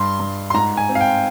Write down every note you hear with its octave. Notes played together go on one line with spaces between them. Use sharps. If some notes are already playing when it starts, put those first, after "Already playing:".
Already playing: G2 C6
G2
C6
G#2 A#5
G#5
C4
F5
G5